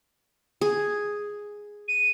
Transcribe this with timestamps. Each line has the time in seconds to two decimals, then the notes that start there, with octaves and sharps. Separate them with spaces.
0.61 G#4
1.88 D#7